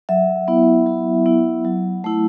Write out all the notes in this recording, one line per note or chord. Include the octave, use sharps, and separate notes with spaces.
F#3 E5
B3 E4
F#3
B3 E4
F#3
A3 E4